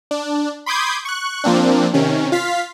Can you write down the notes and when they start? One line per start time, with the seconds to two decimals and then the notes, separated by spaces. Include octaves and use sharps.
0.11 D4
0.66 B5 C6 D6 D#6 G6 G#6
1.05 C#6 F#6
1.44 F3 A#3 C4 D4
1.94 C3 D#3 C#4
2.32 F4 F5 B6